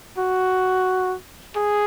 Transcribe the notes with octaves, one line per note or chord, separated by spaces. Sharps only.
F#4
G#4